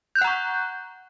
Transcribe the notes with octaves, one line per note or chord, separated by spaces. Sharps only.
F#5 A#5 C#6 F#6 G6